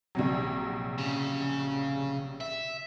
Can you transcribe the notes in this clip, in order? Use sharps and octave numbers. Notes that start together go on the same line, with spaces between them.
A#1 C3 F#3
C#3
E5